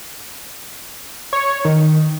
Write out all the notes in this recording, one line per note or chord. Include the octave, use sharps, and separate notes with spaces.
C#5
D#3